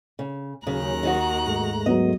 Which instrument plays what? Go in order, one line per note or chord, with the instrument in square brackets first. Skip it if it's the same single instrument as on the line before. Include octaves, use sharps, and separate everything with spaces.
[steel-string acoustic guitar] C#3
[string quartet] D#2 A#5 F#6 [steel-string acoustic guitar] C#3 [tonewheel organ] F#3 C#4 G#4
[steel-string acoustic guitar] D#3 D#4 F#4
[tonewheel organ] G#2 G#3 A3
[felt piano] F#3 B3 [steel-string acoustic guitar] D#5